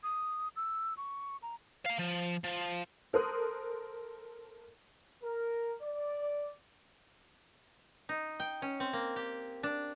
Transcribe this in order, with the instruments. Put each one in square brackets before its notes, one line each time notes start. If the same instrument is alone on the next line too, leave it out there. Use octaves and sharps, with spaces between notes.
[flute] D#6
E6
C#6
A#5
[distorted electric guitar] F5 A#5
F3
F3
[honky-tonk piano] A4 A#4 C5 C6 D#6 F#6
[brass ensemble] A#4
D5
[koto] D#4
G5
C#4
C4
A#3
G4
D4